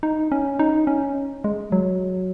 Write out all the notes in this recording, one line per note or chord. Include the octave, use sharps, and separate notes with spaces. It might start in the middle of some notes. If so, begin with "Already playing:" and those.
D#4
C#4
D#4
C#4
G#3
F#3